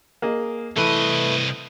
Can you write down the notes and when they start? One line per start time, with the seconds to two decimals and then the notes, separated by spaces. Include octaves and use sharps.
0.22 A#3 G#4 D#5
0.76 C2 E3 A3 B4 D#5